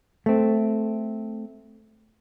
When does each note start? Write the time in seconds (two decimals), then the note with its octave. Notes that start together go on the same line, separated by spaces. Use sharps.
0.26 A3 C4